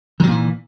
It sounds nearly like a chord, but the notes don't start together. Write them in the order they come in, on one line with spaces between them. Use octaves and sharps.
D#3 F#3 A#2 E3